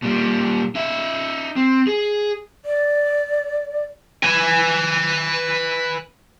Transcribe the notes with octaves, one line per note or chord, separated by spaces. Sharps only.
A#2 G3
D#4 E5
C4
G#4
D5
B4 G#5